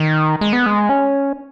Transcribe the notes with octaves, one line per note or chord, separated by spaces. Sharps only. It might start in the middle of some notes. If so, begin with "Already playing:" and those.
Already playing: D#3
G#3
B3
G#3
C#4